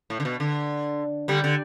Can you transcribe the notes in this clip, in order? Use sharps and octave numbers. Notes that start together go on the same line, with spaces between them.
A2
D3
B2
D3
D3 G3
D3